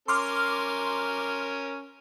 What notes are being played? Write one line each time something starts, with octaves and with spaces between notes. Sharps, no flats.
C#4 A#4 C6 D6 F6